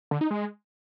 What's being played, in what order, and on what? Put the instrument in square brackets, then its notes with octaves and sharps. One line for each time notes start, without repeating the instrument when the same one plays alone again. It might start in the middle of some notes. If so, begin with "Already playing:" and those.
[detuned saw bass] D3
D#4
G#3